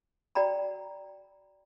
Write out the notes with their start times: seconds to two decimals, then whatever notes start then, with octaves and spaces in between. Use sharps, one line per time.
0.35 F#4 D5 G5 A#5 B5